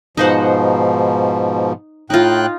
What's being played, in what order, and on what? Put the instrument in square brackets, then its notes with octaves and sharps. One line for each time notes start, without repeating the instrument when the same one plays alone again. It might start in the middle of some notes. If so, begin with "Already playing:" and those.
[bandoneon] G#2 B2 F3 [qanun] D#4 C5 F#5
[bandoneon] A2 G5 F#6 [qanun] D#4 F4